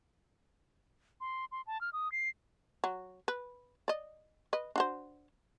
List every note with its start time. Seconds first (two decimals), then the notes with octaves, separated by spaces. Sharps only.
1.21 C6
1.52 C6
1.67 A5
1.81 F6
1.93 D#6
2.12 C7
2.84 F#3
3.28 B4
3.88 D5 D#5
4.53 B4 D#5
4.76 D4 F#4 C5